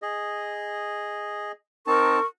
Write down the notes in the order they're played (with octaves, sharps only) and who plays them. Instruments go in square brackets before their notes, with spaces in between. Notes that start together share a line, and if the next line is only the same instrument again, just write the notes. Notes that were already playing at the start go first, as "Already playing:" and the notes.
[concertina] G#4 D#5
[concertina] C4 D#4 A5 [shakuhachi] A#4 [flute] C#6